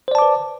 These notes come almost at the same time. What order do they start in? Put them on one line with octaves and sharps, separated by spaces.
C5 D5 A5 D6 B4